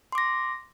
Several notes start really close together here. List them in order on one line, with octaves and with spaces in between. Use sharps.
C6 D6 A#6